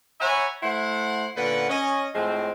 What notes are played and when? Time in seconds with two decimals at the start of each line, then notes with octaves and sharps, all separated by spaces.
0.21 C#5 E5 F#5 G#5 A#5 B5
0.63 A3 E4 C5 F#5
1.36 A#2 D3 B3 C#4 B4 F#5
1.69 C#4 D#5
2.14 A2 F3 G#3 C4